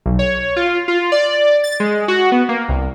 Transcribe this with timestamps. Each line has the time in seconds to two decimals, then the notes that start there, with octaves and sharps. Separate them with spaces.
0.06 B1
0.19 C#5
0.56 F4
0.88 F4
1.12 D5
1.64 A6
1.80 G#3
2.08 F#4
2.32 B3
2.49 A#3
2.68 C2